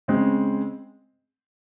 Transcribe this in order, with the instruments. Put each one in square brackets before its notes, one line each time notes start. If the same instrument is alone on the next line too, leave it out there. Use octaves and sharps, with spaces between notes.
[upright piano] C#3 G#3 C4